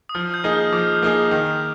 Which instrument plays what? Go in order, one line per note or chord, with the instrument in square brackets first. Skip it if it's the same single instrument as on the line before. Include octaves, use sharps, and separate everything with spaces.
[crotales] D#6
[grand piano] F3 [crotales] F6
[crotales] G6
[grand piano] A#3 D#4 G#4
[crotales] F6
[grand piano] F3 [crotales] D6
[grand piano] A#3 D#4 G#4
D#3